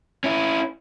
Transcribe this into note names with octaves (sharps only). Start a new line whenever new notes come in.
C#4 E4